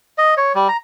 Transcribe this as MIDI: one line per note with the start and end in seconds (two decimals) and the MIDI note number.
0.18 0.34 75
0.37 0.53 73
0.55 0.68 55
0.69 0.77 82